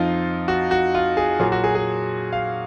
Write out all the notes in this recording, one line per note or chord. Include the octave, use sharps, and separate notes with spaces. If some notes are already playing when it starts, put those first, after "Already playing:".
Already playing: F2 F3 D#4 F4
F#4
F#4
F4
G#4
A#2 F#3 G#4
F#4
G#4
G#4
F5